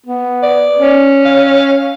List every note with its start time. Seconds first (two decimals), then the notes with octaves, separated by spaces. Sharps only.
0.06 B3
0.43 D5
0.78 C#4
1.25 F5